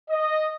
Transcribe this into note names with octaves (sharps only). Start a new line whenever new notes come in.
D#5